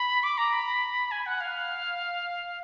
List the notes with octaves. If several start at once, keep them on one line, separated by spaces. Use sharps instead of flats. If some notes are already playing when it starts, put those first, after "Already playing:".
Already playing: B5
D6
A#5
B5
G#5
F#5
F5